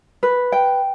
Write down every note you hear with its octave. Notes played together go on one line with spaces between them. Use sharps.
B4
G5